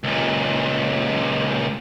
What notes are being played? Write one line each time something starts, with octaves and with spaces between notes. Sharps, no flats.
C#2 A#2